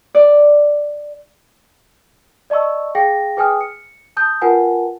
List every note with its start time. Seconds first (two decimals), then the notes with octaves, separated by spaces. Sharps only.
0.15 D5
2.50 D5 D#5 A5 C#6 E6
2.95 G#4 F5 G5 A#6
3.37 G#4 B4 G5 G#5 D#6 F6
3.61 C#7
4.17 A5 D#6 G6
4.41 F4 A#4 B4 F#5 G#5 A5